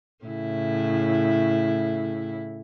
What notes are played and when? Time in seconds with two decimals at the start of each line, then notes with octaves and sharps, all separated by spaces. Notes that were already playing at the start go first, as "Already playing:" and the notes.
0.25 A2 C#3 E4